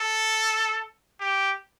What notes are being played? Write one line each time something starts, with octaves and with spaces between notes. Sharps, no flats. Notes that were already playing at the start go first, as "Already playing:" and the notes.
Already playing: A4
G4